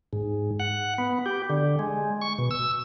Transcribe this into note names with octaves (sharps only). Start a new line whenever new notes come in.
G#2
F#5
B3
G4
D3
G#3
C#6
B2
E6